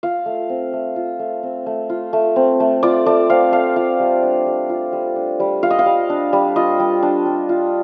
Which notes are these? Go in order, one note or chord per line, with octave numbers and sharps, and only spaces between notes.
F4 F5
A3
C4
A3
F4
A3
C4
A3
F4
A3
C4
A3
F4 D5
A3 D5
C4 F5
A3 F5
F4 F5
G3
D4
G3
F4
G3
D4
G3
F4 F5
D#5
F5
G3
D4
G3
F4 D#5
G3
D4
G3
F4